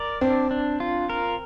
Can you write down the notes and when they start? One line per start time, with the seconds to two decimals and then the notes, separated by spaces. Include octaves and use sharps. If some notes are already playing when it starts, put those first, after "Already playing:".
Already playing: A#4 D5
0.21 C4 D4
0.51 D4
0.80 F4
1.10 A#4